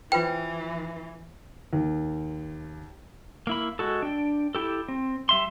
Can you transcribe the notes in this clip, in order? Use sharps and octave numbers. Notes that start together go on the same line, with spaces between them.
E3 F4 B4 C5 G5
D#2
A#3 E4 B5
G#3 F#4 A4
D4 G5
E4 G4 A4
C4
G3 E5 C6